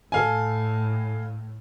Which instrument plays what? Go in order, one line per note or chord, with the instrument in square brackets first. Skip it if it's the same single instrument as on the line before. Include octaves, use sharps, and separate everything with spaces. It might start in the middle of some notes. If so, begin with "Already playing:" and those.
[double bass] A2 [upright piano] A4 F5 G#5